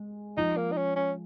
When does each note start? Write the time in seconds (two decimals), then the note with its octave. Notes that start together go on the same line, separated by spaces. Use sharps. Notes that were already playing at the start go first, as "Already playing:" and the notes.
Already playing: G#3
0.37 F3 D#4
0.57 A#3
0.72 D#4
0.77 C#4
0.96 C#4